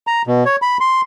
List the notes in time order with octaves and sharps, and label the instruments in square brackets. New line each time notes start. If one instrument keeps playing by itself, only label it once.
[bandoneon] A#5
B2
C#5
B5
C6